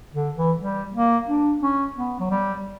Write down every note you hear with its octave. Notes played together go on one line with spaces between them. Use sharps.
D3
E3
G3
A#3
D4
C#4
B3
F#3
G3